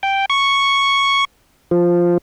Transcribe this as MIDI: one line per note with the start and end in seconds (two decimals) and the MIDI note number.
0.03 0.25 79
0.30 1.25 85
1.71 2.18 53